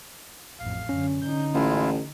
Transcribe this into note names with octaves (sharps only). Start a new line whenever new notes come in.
A1 F2 F5
F#2 D3 C#4
D3 D#4 G6
A1 G#3 E4 F4